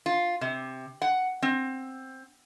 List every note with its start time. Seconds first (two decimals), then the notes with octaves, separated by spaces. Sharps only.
0.06 F4
0.41 C3
1.02 F#5
1.42 C4